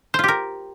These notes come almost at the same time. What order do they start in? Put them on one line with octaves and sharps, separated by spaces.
C5 F4 G4 A#4